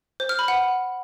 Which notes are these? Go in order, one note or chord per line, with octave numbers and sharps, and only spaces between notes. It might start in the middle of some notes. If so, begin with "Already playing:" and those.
C5
F6
B5
F#5